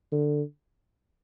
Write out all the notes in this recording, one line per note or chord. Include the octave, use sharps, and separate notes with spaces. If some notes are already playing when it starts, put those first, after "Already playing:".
D3